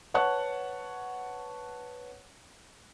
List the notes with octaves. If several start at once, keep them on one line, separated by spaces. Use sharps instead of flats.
B4 C#5 F#5 A5 C#6 F#6